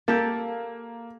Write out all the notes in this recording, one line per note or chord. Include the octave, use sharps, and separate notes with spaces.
A#3 G4 A4